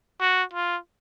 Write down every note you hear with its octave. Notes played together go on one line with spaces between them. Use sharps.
F#4
F4